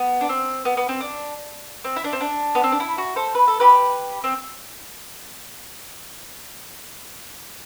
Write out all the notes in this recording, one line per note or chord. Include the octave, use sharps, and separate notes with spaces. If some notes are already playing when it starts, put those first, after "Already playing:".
Already playing: B3
D4
C4
B3
B3
C4
D4
C4
E4
D4
C4
D4
B3
C4
D4
E4
F#4
A4 C5
B4
A4
G4 B4
C4